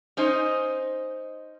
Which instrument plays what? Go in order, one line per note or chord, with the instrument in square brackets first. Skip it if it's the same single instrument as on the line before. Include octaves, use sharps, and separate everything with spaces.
[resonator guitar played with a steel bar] C#4 D#4 C5 D#5